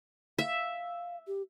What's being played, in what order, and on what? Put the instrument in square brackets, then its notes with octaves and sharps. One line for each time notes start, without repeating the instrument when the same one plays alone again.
[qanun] E5 [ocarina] F5
[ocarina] G4